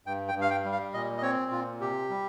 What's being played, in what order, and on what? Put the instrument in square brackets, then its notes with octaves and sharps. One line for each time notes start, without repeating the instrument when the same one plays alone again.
[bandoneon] G2 G5
G5
G2
F5
G5
G3
F5
A#2 D#5
D#5
C4 C#5
A#2 F4
C3 G4
G3